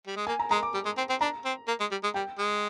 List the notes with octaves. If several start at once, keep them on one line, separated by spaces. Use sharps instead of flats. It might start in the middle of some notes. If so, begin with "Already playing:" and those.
G3
G#3
A#3 G#5
A#5
G#3 A#5
D6
G3
G#3
C4
C4
D4 A#5
C4
A#3
G#3
G3
G#3
G3 G5
G#3